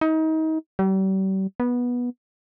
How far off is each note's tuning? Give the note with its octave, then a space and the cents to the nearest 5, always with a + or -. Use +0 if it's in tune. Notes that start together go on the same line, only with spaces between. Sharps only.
D#4 +30
G3 -40
B3 -15